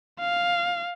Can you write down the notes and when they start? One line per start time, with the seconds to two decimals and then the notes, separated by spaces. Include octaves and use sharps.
0.20 F5